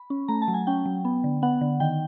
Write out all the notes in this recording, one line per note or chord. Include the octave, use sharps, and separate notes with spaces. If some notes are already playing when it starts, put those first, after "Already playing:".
Already playing: B5
C#4
A3 A#5
A5
F#3
G#5
C#4 G5
F#3
B3
D3
B3 F#5
D3
D#3 G5